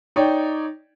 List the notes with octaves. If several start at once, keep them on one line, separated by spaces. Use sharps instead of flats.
D#4 C#5 D5 G5